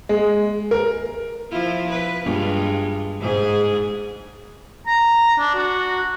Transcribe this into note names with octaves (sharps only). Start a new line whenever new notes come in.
G#3
A#4
F3 E4 F4
B4
G2 G#3 F4
G#2 G#4
A#5
D4
F#4